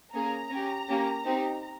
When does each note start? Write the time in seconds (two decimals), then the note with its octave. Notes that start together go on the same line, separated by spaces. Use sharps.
0.14 A#3 C#4 G#4 A#5
0.50 C#4 G4
0.88 A#3 C#4 G4
1.25 C4 D#4 G4